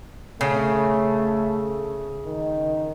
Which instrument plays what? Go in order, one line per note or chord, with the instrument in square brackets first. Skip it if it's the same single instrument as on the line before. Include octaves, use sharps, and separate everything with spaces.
[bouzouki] C#3 [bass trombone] A3
[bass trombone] D#3